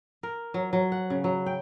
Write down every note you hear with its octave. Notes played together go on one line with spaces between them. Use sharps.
A#4
F#3
F#3
F#5
C#3
F#3
G5